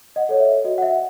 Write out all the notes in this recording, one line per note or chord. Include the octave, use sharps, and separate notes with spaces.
D#5 F#5
A4 C#5
E5
F#4 D#5
F#5
E5